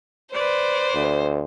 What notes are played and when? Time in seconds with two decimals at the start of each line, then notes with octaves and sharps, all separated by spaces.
0.34 B4 C5 D5
0.95 D2